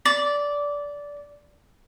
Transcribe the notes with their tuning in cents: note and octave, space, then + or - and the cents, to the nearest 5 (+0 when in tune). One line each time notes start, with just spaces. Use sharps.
D5 -15